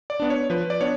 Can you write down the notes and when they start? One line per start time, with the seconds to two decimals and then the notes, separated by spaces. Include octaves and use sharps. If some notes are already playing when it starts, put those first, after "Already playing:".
0.10 D5
0.20 B3 D4
0.30 C#5
0.50 F3 B4
0.70 D5
0.81 B3 D4 C#5